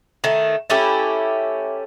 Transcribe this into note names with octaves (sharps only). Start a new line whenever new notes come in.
D#3 A3
A3 C#4 E4 G4